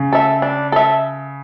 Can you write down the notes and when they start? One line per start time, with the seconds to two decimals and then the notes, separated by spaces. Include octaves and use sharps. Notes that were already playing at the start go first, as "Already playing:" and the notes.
Already playing: C#3
0.13 A4 E5
0.42 D4
0.72 A4 E5